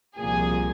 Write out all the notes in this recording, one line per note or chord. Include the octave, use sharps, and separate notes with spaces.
C2 A#2 F3 G#4